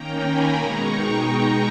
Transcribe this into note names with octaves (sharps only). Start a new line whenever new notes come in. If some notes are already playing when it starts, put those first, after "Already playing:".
Already playing: D#3 A#3 C#4 G5 A#5
G#5 B5
B2 G#3 D#4 A#5 C#6
G5 A#5